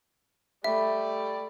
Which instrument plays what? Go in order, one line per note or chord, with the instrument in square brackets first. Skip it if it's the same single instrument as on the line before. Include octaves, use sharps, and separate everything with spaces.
[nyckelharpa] A3 [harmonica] G4 D5 [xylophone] E5 [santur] B5